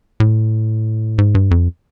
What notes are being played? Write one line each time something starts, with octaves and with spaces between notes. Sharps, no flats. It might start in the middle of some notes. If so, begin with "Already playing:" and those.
A2
G#2
G2
F2